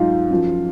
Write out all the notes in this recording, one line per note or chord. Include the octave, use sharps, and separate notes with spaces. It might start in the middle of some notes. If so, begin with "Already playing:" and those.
Already playing: G#2 F#3 D#4 F4
F#2 F3